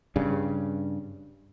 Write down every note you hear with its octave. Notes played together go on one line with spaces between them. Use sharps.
G2 C#3